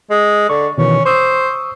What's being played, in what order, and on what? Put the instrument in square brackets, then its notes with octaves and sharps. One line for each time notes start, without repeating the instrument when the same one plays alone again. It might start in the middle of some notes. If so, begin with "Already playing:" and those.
[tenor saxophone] G#3
[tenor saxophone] D3 [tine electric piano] C#6
[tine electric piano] B2 D#3 E3 [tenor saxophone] C#4
[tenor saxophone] C5 [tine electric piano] C#6 D#6 E6